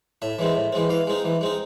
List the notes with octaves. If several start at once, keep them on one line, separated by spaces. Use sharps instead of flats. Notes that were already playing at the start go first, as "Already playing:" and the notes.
A2 E5
E3 G#3 C4
A2
E3 G#3 C4
E3 F5
G#3 C4 D#4
E3
G#3 C4 D#4